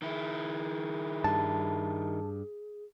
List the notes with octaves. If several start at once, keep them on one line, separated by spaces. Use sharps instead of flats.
D#3 E4 G#4
G2 A5